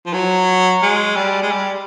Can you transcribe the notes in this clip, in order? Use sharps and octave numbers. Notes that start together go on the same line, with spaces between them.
F3
F#3
G#3
G3
G#3
G3